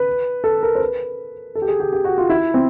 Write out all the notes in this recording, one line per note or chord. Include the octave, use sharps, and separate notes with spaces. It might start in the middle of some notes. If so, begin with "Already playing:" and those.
Already playing: B4
A4
A#4
C5
B4
A4
G4
G#4
G4
G4
F#4
F4
E4
C4